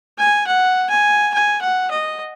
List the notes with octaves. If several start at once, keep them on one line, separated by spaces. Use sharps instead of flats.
G#5
F#5
G#5
G#5
F#5
D#5